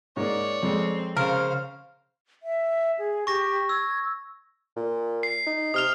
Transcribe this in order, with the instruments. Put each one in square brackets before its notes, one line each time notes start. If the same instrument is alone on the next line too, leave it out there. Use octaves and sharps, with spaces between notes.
[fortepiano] G#2 A#3 [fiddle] C#5 D5
[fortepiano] F2 G#3 [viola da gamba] C4
[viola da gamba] C#3 [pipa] A#4 [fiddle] C5 F5
[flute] E5
G#4
[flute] G4 [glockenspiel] C#6 A#6
[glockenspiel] E6 [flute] G#6
[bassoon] A#2
[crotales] C7
[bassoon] D#4
[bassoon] C3 [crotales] D#6 F6 F7